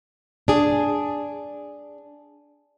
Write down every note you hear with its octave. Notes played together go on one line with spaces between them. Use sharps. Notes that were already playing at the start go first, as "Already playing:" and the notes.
D4 G#4